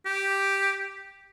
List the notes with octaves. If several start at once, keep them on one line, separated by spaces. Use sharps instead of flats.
G4